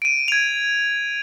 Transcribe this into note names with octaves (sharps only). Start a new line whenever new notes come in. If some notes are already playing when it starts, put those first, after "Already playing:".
D7 D#7
G#6 F7